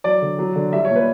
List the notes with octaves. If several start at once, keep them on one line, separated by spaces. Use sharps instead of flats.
F#3 D5
D3
F#3
D3
G3 E5
C#5
A#2
B4